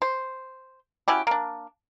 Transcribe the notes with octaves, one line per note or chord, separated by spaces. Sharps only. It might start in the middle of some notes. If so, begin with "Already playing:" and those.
C5
C#4 E4 F#4 G4
A#3 D4